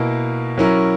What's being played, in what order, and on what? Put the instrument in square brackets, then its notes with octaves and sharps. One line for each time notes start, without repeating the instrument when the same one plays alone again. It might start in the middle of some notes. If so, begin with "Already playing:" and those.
Already playing: [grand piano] B2 A#3 E4 A#4
F#3 C#4 E4 A#4